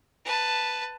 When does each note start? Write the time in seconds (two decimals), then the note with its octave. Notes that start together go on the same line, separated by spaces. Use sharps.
0.25 B4 A5